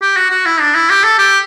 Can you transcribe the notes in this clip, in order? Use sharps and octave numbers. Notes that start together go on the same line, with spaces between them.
G4
F#4
F#4
E4
D4
E4
G4
A4
G4